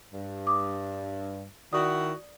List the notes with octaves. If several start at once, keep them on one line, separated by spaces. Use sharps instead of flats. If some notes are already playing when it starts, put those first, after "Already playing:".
G2
D6 D#6
D#3 E4 F#4 D5 D#6